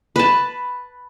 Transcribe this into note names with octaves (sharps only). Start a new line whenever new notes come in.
B4 A5